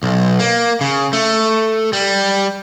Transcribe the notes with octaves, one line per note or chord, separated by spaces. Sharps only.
B1
A#3
C#3
A3
G3